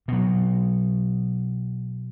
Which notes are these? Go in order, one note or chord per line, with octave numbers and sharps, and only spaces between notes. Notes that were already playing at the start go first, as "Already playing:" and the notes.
B2 F#3